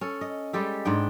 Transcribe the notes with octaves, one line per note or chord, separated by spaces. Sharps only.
C#4 A4
D#5
G3 G#3 G4 A4
G#2 B3 D4 G5